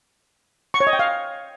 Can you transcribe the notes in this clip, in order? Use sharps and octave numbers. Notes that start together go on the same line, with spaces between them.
C#6
C#5
D#5
G5
F5